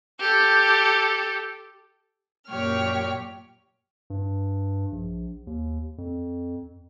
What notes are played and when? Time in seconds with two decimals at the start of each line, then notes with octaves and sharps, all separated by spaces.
0.20 G4 A4
2.49 F#2 A#2 G4 C#5 G5 F6
4.10 G2
4.92 A#1
5.47 D#2
5.98 F2